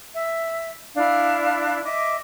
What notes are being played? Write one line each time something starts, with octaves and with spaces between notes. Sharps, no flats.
E5
D4 E4 F5
D#5 E5 D6